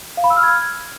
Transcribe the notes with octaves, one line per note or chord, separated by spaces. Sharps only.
F5
B5
E6
F6
G#6